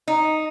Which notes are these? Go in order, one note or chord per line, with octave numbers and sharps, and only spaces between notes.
D#4